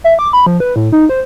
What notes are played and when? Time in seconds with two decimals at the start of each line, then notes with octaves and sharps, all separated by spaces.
0.04 E5
0.19 D6
0.33 B5
0.46 F3
0.60 B4
0.76 A2
0.92 D#4
1.09 C5